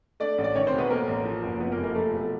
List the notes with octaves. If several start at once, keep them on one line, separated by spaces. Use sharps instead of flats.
A3 D4 D5
A1
D5
D#3 C#4 C#5
C4 C5
E1
B3 B4
A3 A#3 A#4
A1
F3
F#1
F3 B3 B4
A#3 A#4
F1
A#3 A#4
F3 A3 A4
E1